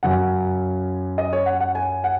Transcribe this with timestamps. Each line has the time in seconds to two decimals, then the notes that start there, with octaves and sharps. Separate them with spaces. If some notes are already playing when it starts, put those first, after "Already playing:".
0.03 F#2 C#3 F#3 C#4 F#5
1.18 D#5
1.33 C#5
1.46 F#5
1.60 F#5
1.75 G#5
2.04 F#5